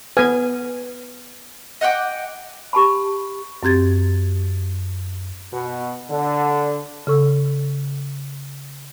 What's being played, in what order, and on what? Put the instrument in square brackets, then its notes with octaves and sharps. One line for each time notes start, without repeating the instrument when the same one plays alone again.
[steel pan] B3 G#5 [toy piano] B4
[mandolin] D#5 F#5 G5 D6
[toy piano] G4 A5 B5
[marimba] F#2 C4 G4 G#6 A6
[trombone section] B2
D3
[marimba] C#3 A4 C#6 E6